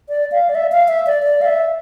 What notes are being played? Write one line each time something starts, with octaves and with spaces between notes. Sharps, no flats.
D5
F5
D5
E5
F5
E5
D5
D5
F5
E5